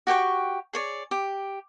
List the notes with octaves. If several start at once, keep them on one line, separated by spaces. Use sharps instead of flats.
F#4 G4 G5 C#6
G#4 C#5 D5
G4